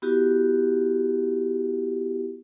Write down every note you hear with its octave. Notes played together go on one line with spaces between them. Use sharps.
B3 E4 F#4 G4